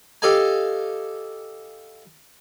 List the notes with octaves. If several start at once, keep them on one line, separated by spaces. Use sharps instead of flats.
G4 A4 D#5 F5 G#5